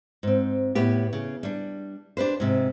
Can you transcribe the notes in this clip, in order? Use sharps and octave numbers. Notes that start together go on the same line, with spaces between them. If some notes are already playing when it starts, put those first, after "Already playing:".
G#2 C4
A2 B3 G4
C#3
G3 D4
D4 G4 B4 C5
G#2 C3